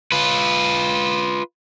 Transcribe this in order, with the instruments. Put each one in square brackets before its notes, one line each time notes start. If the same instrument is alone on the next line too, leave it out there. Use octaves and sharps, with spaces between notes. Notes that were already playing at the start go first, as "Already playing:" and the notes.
[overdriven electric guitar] F4 B4